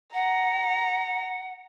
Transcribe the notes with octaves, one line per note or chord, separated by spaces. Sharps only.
F#5 A#5